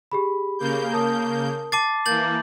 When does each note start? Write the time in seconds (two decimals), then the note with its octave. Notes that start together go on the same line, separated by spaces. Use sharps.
0.12 G4 G#4 B5
0.59 C#3 A#3 G6
0.93 A#4 A5 D#6
1.72 A5 D6 A6 C7
2.06 E3 A#3 G6 A6 F#7